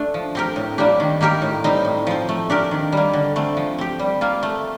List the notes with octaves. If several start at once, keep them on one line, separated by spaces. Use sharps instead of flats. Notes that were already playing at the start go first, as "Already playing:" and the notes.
Already playing: A3 D4
F3
C4 G4 A#4
A2
G3 A#3 D4 G4
D#3
A#3 D#4 G4 A#4
A2
G3 C4 D#4
A2
F3 C4
A3
D4 G4 A#4
D#3
G3 A#3
D3
A3 C4
F3
C4 G4
G3
A#3 F4
A3